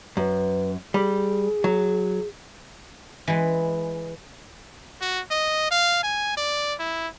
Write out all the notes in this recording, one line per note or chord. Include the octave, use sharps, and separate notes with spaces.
F#2 B4
G3 G#4
F#3
E3 G#3
F#4
D#5
F5
G#5
D5
E4